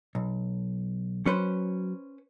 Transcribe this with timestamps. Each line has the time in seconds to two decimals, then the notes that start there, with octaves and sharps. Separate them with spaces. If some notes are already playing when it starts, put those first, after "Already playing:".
0.15 B1
1.26 F#3 C#4 B4 C5